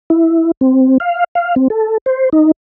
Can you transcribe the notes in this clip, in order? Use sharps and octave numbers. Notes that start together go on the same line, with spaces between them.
E4
C4
F5
F5
C4
A4
C5
D#4